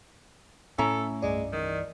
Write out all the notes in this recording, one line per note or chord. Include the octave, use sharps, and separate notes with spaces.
A2 C#4 E4 A4 A#5
C2 G2 G#3 D5
D#3 E3